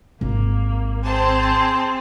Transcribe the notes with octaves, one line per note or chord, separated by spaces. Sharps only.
G#1 A#3
C4 G#4 C5 A5